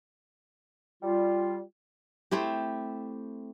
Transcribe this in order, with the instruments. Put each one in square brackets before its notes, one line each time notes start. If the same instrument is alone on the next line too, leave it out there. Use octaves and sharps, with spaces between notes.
[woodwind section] G3 F4
[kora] A3 C4 E4 G4